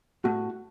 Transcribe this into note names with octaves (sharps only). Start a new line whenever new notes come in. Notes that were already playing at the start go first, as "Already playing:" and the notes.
A2 F#4